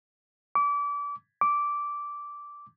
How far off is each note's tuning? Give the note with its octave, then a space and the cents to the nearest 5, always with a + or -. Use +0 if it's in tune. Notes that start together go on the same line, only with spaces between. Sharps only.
D6 -30
D6 -10